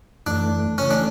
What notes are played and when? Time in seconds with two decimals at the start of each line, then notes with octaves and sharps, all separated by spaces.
0.26 F#2 E3 A3 D4
0.78 C#3 E3 A3 C#4
0.91 D4